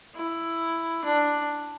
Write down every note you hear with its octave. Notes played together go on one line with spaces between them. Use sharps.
E4
D4